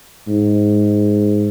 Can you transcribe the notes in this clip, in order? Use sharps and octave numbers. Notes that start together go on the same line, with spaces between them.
G#2